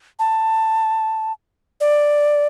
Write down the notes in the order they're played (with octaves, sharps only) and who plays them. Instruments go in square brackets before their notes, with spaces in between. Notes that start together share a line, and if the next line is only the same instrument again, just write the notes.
[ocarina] A5
D5